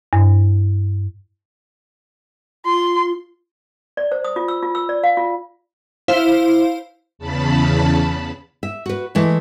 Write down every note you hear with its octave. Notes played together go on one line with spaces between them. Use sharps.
G2
F4 C6
D5
C5
D#6
F4
E6
F4
E6
D5
F5
F4
E4 C5 F5
E2 C#3 A5 B5
E5
F#4 B4
E3 G#3 A3